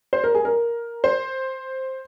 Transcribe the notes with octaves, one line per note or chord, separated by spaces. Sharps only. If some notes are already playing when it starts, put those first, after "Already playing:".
C5
A#4
G#4
A#4
C5